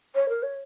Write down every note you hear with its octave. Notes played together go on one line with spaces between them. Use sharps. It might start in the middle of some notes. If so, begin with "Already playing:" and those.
C#5
A#4
C#5